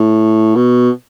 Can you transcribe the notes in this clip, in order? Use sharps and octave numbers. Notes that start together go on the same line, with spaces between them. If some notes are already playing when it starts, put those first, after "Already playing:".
Already playing: A2
B2